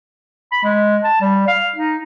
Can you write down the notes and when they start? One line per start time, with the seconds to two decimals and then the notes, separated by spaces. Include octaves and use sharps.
0.52 B5
0.63 G#3
1.04 A5
1.21 G3
1.47 F5
1.76 D#4